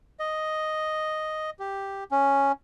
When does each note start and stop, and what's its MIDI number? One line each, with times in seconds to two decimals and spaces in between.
0.20 1.50 75
1.59 2.04 67
2.11 2.52 61